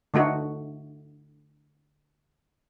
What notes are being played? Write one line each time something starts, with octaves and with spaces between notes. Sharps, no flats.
D3 A3 D#4 F#4